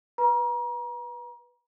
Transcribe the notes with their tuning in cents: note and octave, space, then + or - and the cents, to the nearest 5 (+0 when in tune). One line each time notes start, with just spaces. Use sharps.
B4 -10 A#5 +35